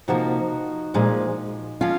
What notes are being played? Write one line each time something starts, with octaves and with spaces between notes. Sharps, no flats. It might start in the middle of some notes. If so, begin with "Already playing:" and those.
C3 F3 A#3 D#4 F#4
A#2 F3 G#3
F3 C#4 F4